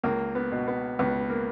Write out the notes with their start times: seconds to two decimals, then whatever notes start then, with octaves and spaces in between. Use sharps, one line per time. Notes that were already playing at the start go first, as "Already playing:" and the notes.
0.03 C#2 A#3
0.35 B3
0.52 B2
0.68 B3
0.99 C#2 B3
1.30 A#3